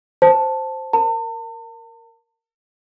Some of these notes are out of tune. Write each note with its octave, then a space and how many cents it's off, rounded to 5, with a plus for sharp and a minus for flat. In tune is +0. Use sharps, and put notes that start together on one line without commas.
C5 +0 A5 +0
A#4 +0 A5 +45